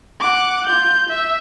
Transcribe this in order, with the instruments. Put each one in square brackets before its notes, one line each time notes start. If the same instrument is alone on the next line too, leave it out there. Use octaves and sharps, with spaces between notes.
[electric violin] F#5 D6
F4 G6
E5